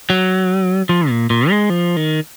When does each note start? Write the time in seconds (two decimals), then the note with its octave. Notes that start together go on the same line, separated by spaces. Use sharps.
0.10 F#3
0.89 F3
1.09 A#2
1.30 A#2
1.50 G#3
1.70 F3
1.96 D#3